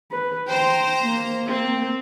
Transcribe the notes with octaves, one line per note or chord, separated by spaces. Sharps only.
B4
C5 G5 A#5
A#3
C4